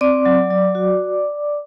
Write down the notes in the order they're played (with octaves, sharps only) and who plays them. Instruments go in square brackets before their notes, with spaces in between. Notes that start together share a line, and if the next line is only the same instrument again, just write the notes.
[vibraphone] C4 D5 D6
F#3
F#3
F#4